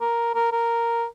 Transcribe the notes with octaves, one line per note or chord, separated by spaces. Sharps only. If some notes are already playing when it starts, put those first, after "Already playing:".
A#4
A#4
A#4